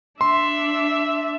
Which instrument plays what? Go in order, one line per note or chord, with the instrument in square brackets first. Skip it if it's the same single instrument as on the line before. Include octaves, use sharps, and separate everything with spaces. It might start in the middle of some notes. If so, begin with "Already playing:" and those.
[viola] D4 E5 [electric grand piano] C6